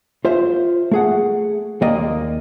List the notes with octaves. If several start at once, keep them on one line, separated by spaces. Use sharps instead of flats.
F4 C5 E5
A3 G#4 F#5
D#2 A#3 D5 D#5 G5